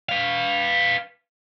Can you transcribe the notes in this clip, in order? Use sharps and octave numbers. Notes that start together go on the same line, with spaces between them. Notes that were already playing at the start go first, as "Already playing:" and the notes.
B4 F5